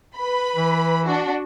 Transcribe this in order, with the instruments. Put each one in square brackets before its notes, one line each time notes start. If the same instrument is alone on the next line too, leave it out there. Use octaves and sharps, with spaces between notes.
[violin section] B4 B5
[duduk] E3
[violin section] D4 F#4